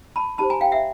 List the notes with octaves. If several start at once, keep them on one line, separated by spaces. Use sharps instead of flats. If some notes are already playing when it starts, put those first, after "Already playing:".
A5 B5
D#4 G4 C5 A5 B5
G#5 A#5
F5 G5
E5 F#5